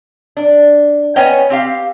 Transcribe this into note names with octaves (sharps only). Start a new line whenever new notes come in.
D4
B3 C#4 C#5 D#5 G5 G#5
C4 G4 F5